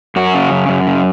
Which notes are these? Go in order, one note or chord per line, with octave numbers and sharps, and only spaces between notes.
F#2 F#4
C#3
F#2
F#2
C#3